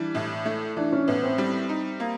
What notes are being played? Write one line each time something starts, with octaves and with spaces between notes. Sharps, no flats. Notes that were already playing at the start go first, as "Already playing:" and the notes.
Already playing: E3 G3 D4
A2
A3
E3 D4
C#4
A2 B3
C4
G3
D#4
A#3